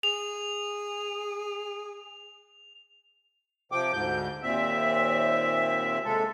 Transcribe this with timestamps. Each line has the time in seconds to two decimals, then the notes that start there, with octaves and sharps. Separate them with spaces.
0.03 G#4 F7
3.72 C3 F3 G5 D6
3.93 D2 G#2 G6
4.43 D#2 A#2 C4 E5
6.04 C3 G#3 A4